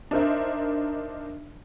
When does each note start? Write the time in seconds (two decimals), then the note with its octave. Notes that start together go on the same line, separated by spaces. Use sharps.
0.11 D4 D#4 A#4 C5 E5